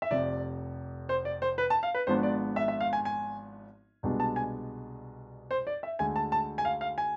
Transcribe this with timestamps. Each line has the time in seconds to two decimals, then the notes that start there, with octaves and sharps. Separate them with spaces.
0.02 E5
0.11 F1 F2 C3 D5
1.09 C5
1.25 D5
1.42 C5
1.58 B4
1.70 A5
1.83 F5
1.95 B4
2.07 G#1 G#2 F3 B3 D4 C5
2.23 D5
2.56 E5
2.68 E5
2.80 F5
2.93 G#5
3.05 G#5
4.03 C2 B2 G#3 B3 D4
4.20 A5
4.36 G#5
5.51 C5
5.67 D5
5.83 E5
5.99 D2 D3 G#3 G#5
6.16 A5
6.32 A5
6.58 G#5
6.65 F5
6.81 F5
6.98 G#5